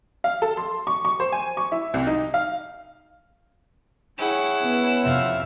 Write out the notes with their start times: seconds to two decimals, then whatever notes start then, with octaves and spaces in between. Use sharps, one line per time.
0.24 F5
0.42 A4
0.57 C6
0.87 C#6
1.05 C#6
1.20 C5
1.32 G#5
1.57 C#6
1.72 E4
1.94 C2
2.07 D#4
2.34 F5
4.18 E4 G#4 C#5 F#5 G5
4.63 B3 C#4
5.03 F2 C3 C4 E5 F5